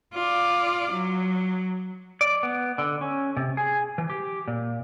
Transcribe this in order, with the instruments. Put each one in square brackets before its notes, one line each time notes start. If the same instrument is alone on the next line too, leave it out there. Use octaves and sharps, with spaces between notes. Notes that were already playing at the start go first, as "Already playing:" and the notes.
[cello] F4 D5
F#3
[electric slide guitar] D5
B3
D3
C#4
C3
G#4
E3
G4
A#2